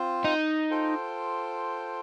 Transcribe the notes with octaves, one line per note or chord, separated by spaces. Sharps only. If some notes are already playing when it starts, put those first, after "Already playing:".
Already playing: C4 F4 C5
D#4
F4 A4 C5 G5